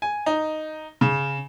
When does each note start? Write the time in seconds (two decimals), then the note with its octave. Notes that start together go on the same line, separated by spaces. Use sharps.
0.02 G#5
0.26 D#4
1.01 C#3